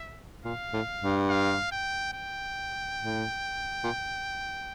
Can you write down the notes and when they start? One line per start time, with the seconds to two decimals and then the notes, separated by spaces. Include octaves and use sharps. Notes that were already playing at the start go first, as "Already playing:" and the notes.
Already playing: E5
0.44 A#2 F5
0.73 A2
1.01 G2
1.29 F5
1.72 G5
2.13 G5
2.99 A2
3.83 A#2